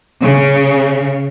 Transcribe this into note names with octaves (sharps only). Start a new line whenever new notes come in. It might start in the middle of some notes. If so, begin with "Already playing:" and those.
C#3